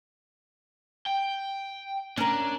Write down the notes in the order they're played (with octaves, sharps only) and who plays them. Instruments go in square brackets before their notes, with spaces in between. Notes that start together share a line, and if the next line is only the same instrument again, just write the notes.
[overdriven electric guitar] G5
[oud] C#4 A#4 [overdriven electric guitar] D4